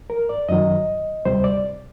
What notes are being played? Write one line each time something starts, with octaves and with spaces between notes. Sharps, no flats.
A#4
D5
F#2 D#3 F#3 D#5
D2 C3 G3 C5
D5